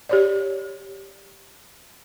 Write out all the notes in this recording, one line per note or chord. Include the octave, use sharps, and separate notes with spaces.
G4 C#5 D5